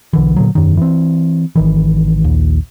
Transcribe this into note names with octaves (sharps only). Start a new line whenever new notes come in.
B1 D3 E3
A#2 D3 F#3
E1 F#2 D#3
E3 C4
G#1 D#3 E3
A#1 D#2